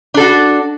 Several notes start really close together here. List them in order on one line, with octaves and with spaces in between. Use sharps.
D4 A4 F#4